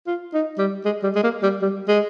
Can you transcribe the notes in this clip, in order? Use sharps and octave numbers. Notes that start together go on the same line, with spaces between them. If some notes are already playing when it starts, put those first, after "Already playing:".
F4
D#4
G3
G#3
G3
G#3
A#3
G3
G3
G#3